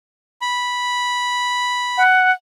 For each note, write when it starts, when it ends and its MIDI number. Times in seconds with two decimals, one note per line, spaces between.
0.42 2.03 83
1.98 2.32 78